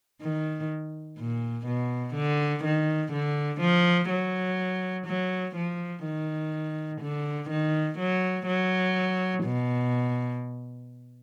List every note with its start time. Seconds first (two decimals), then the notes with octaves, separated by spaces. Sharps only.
0.21 D#3
1.18 A#2
1.66 B2
2.14 D3
2.64 D#3
3.12 D3
3.61 F3
4.09 F#3
5.06 F#3
5.56 F3
6.04 D#3
7.01 D3
7.49 D#3
7.99 F#3
8.46 F#3
9.44 B2